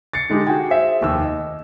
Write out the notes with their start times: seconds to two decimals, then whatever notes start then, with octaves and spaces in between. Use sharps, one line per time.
0.13 A6 C7 C#7
0.30 D3 G#3 D#4 G4
0.47 F#4 G#4 G5 G#5
0.70 G#4 C5 E5
1.01 F1 D#2 D#3 E6
1.25 D#5